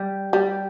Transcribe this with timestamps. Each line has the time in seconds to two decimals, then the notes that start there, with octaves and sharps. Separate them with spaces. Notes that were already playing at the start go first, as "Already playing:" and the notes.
Already playing: G3
0.33 G3